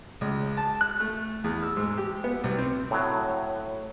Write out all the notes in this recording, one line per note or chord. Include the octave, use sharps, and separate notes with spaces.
C#2
A5
F#6
A3
E2
E6
G#2
G4
B3
C2
C4
A2 F#3